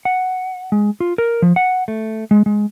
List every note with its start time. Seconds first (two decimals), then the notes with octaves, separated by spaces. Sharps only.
0.05 F#5
0.72 G#3
1.00 F4
1.18 A#4
1.42 F3
1.56 F#5
1.88 A3
2.31 G#3
2.46 G#3